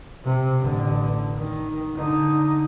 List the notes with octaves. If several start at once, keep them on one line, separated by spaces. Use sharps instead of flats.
C3
A1 D3
D#3
D3 D#4